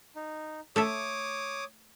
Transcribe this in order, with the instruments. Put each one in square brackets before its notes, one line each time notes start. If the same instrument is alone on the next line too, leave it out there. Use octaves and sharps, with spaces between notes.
[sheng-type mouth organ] D#4
[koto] A3 A4 E5 [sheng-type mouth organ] C#5 D6 D#6